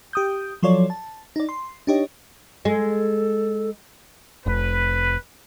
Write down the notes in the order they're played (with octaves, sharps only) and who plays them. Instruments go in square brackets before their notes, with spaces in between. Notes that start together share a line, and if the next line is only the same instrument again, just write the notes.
[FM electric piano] G4 D#6 G6
F3 F#3 F4 A4 C#5 D5
A5
D#4 D5
C6
D4 D#4 G4 C#5 D#5
[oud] G#3 [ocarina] A4
[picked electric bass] F1 [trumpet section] B4